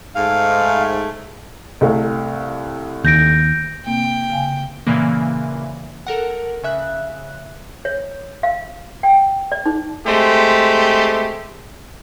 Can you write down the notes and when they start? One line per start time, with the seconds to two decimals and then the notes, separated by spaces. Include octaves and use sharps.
0.15 G#2 A3 F5
1.81 C2 A3 F5
3.04 D#2 G6 A#6 D7
3.86 C3 A#3 C4 G5
4.30 C#3 F5 G#5
4.87 A#2 C#3 E3 A#3
6.07 A4 A#4 F#5
6.63 C#3 E5 F#6
7.85 C#5
8.43 F5
9.03 G5
9.52 D5
9.66 D#4
10.06 G#3 A3 C4 G4